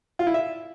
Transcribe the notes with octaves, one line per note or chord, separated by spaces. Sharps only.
F4
E4
E5